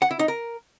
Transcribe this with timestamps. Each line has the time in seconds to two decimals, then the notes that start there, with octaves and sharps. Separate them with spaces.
0.02 F#5
0.11 E4
0.19 D#4
0.28 A#4